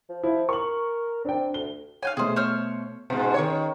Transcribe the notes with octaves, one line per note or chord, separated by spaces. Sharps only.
F3
F3 E4
A#4 C#6 F#7
C4 D4 G5
D2 G7
C#5 F5 G5 G#5
B2 A3 G#4 C5
C5 C#5 F6
G#2 B2
D#3 C#5